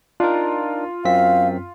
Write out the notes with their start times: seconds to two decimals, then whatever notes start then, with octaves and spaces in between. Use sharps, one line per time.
0.20 D4 D#4 F4 A#4
1.05 F#2 C4 F5 B6